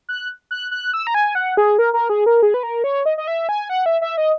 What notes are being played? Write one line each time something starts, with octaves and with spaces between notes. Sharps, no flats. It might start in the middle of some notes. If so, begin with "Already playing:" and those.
F#6
F#6
F#6
E6
A#5
G#5
F#5
G#4
A#4
A#4
G#4
A#4
G#4
B4
A#4
C#5
D#5
D#5
E5
G#5
F#5
E5
E5
D#5